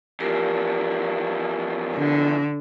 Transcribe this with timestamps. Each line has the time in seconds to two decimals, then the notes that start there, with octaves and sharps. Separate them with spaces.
0.20 E2 F3 G4 A#4
1.95 D3